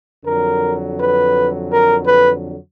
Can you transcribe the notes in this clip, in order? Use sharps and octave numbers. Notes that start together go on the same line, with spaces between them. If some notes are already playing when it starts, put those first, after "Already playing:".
F2 D3 F#3 A#4
B4
A#4
B4